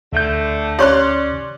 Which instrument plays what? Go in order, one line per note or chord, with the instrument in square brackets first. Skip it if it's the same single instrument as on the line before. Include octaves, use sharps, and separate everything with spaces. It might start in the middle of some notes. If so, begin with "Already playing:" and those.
[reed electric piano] D2 G6 [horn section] D3 A3
[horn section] C#4 [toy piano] G4 C#5 C#6 [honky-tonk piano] D5 C6 F#6